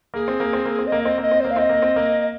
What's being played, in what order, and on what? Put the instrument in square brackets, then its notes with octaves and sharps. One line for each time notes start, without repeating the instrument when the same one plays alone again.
[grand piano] A#3 [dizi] G#4
[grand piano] C4
A#3
C4
A#3
C4
[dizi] D#5
[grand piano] A#3
[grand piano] C4 [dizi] D#5
[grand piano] A#3 [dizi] D#5
[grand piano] C4
[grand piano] A#3 [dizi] C5
[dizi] F5
[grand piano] C4 [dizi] D#5
[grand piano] A#3
C4
A#3